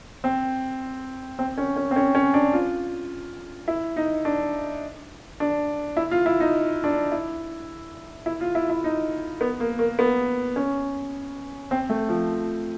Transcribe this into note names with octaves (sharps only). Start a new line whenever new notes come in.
C4
C4
C#4
C#4
C4
C#4
C#4
D4
F4
E4
D#4
D4
D4
E4
F4
E4
D#4
D4
E4
E4
F4
E4
E4
D#4
B3
A#3
A#3
B3
C#4
C4
A3
F3